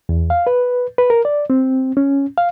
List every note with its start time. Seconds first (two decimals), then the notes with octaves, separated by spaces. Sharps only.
0.09 E2
0.30 F5
0.47 B4
0.98 B4
1.10 A#4
1.25 D5
1.50 C4
1.97 C#4
2.37 F5